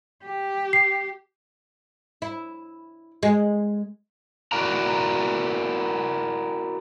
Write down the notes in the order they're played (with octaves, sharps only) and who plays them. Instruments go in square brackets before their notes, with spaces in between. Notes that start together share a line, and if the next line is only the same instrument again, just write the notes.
[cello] G4
[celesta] C7
[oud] E4
G#3
[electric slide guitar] E4 F#4 A#4 D5 F5 A#5